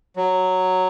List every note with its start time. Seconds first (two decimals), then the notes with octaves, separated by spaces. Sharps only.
0.17 F#3